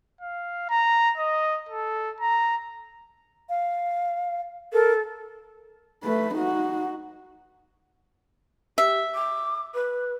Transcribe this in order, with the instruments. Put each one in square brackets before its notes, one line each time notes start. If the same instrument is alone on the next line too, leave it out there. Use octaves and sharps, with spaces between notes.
[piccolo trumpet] F5
A#5
D#5
A4
A#5
[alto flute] F5
[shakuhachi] A4 [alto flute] A#4
[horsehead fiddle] A3 B4
D#4 F#4
[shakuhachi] G4 [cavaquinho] E5
[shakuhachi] D6
B4